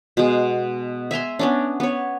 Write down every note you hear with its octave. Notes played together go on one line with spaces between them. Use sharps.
B2 G#3
E5 G#5 A#5 C6
B3 C#4 D4
B3 C#5